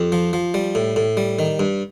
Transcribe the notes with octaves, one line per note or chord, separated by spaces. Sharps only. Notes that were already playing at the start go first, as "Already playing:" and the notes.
Already playing: F2 G4
F3
F3
G3
A2
A2
G3
D#3
G2